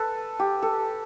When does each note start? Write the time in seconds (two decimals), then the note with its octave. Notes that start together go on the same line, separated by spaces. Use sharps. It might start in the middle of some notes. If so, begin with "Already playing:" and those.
Already playing: A4 B4
0.40 G4
0.62 A4